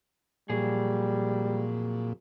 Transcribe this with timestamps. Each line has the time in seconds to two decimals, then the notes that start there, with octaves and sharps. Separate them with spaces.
0.50 F2 A#2 F#3 G3 G#4